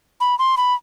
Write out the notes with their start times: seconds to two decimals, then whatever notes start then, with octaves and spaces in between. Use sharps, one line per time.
0.21 B5
0.39 C6
0.57 B5